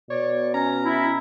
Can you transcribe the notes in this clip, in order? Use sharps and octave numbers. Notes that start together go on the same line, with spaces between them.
B2 C#5 D5
C#4 A#5
E4